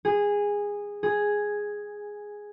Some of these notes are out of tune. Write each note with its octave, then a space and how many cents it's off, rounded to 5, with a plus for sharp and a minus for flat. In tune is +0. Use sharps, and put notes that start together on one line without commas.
G#4 -15
G#4 +0